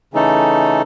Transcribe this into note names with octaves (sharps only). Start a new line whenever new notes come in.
C#3 E3 A3 D#4 A4